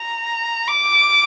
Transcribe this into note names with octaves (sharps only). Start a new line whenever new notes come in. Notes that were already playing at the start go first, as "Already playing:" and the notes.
Already playing: A#5
D6